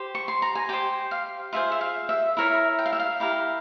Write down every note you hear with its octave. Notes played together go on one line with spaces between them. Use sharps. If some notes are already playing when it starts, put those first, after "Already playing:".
Already playing: G4 C5
C#6
C6
A#5
G#5
G4 C5 G5
F5
F4 G#4 C5 E5
E5
F5
E5
E4 A#4 C#5 E5
G5
F5
E5
F5
E4 G4 A#4